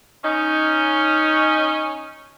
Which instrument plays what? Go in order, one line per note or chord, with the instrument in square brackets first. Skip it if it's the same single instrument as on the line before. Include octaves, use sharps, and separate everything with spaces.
[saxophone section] C#4 D#4